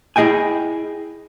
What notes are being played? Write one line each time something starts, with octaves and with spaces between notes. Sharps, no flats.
E4 G#4 D#5 G5 G#5